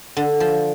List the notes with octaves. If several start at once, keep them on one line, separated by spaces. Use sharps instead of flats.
D3
F3